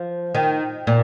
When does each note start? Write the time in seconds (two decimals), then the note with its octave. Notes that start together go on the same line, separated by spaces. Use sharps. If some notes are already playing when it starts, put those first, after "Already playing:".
Already playing: F3
0.35 D#3
0.87 A#2